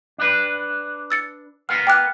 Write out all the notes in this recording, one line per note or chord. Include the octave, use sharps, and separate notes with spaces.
D4 B4
E6 A6 C#7
B3 A#4 F5 F6
G5 D6 F#6